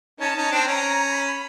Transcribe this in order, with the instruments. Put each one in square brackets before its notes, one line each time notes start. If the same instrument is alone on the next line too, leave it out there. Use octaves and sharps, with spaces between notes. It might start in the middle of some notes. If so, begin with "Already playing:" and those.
[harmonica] C#4 D#4 [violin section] A5
[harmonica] C#4 D#4
C4 D4
[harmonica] C#4 [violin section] A#5
[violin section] B5